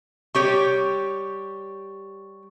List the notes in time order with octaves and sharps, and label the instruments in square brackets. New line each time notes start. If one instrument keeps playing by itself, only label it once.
[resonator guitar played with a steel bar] G3 G4 C#5 [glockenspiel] C#6